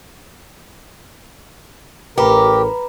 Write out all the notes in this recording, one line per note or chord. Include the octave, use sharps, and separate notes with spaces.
A1 A2 G4 A#4 B4 A#5 B5